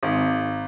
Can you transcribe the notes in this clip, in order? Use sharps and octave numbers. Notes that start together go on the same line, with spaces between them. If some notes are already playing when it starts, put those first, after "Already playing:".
G#1